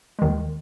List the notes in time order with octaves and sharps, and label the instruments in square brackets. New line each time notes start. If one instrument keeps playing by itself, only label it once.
[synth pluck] D#2 D#3 G#3